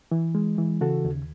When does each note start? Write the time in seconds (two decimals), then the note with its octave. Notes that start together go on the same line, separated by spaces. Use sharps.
0.11 E3
0.35 G#3
0.58 E3
0.81 C#3 F#4 A4
1.05 D#2